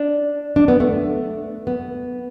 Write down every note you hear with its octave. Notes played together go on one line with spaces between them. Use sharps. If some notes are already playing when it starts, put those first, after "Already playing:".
Already playing: D4
D4
B3
A3
B3